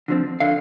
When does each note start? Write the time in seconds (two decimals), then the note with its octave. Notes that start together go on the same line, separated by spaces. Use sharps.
0.08 D3 F3 C4
0.40 D3 F5